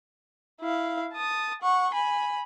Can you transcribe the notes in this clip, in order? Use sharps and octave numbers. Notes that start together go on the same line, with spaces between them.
E4 F5
A5 D#6
F#5 C#6
G#5 B5